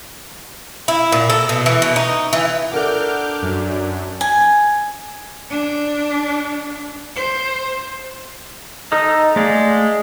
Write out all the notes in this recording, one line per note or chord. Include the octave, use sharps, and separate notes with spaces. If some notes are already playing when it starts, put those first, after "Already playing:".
E4
A#2
A4
B2
E3
B2
D#4
E3
D4 A4 A#4 F#5 D6 F6 G6
F#2
G#5
D4
C5
D#4 A4 D#6 F6
G#3 A3 D5 F5